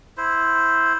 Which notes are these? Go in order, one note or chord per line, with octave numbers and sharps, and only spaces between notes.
E4 C5